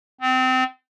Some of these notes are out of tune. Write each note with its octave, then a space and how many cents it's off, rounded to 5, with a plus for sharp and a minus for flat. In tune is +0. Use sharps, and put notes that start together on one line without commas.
C4 -25